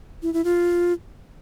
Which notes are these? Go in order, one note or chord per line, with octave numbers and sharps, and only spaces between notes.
E4
E4
F4